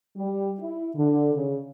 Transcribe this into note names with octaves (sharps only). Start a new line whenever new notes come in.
G3
E4
D3
C#3